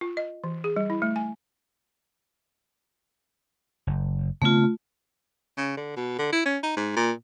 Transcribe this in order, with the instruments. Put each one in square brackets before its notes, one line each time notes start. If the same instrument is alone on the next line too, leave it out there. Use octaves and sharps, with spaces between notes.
[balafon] F4
D#5
E3
G#4
G3
E4
A3
G#5
[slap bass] F#1
[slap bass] C#3 B3 C4 [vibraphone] A3 F4
[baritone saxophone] C#3
D3
B2
D3
E4
C#4
D#4
G#2
A#2